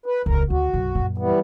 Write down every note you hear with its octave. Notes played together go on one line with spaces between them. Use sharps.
B4
D#1 C#2 A#4
D2 F#4
B1 F#2
F#2 A#2
E3 G3 B3